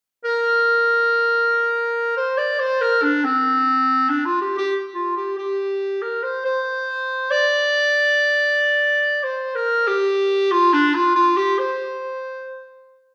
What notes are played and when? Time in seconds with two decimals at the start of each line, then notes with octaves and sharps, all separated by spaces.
0.24 A#4
2.17 C5
2.37 D5
2.59 C5
2.81 A#4
3.02 D4
3.24 C4
4.09 D4
4.25 F4
4.41 G4
4.58 G4
4.95 F4
5.16 G4
5.38 G4
6.02 A#4
6.23 C5
6.45 C5
7.31 D5
9.23 C5
9.55 A#4
9.87 G4
10.52 F4
10.73 D4
10.95 F4
11.15 F4
11.37 G4
11.58 C5